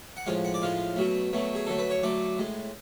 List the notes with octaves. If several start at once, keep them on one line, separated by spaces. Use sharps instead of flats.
F#5
A2 F3 G#3 F5
F#5
D5
A2 F3 G#3 F5
B2 F#3 A3
B2 F#3 A3
G#4
D3 F#3 A3 A4
B4
C#5
D3 F#3 A3 D5
A2 G#3